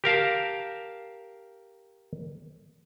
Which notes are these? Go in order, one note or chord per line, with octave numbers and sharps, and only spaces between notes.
G4 A#4 F5 A5